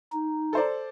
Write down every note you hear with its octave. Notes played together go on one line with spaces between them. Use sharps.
D#4
A4 C5 D5